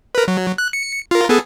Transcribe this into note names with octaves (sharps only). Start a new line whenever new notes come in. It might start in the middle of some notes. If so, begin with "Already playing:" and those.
A#4 B4
F#3
F#6
C#7
F4 A#4
B3 G#4 A4